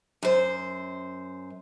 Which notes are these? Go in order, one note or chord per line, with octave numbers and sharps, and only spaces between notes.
F#2 C5